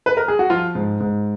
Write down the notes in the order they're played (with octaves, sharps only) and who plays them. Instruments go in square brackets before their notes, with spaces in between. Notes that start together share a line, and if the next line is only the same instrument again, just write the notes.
[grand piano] B4
A#4
G#4
F#4
F3 F4
G#2
G#2